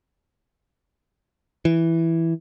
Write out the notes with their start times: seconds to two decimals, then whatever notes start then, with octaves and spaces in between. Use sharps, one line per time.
1.65 E3